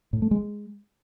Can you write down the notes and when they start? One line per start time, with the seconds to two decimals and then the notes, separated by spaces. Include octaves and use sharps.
0.13 A2
0.22 A3
0.31 G#3